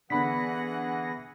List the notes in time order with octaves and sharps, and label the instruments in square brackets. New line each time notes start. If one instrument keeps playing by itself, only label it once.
[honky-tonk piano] D3 [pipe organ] E3 G#4 A#6 [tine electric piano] B3 B5 B6 [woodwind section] F#5